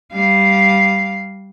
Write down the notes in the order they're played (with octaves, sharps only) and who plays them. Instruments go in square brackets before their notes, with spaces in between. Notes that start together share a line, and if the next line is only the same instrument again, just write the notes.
[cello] G3 F5